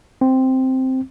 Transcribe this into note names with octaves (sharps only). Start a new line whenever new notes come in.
C4